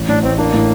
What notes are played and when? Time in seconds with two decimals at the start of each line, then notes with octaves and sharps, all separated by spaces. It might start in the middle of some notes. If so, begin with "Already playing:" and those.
Already playing: A1
0.09 A2 D4
0.23 A1 C4
0.38 A#3 D4
0.53 A2